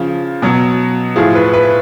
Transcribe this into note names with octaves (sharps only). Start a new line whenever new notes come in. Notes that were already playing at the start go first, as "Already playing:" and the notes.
Already playing: C#3 F3
B2 F#3
A2 F3 G#4
B4
B4